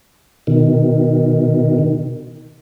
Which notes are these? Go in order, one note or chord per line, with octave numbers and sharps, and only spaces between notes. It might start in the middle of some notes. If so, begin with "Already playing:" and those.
B2 D#3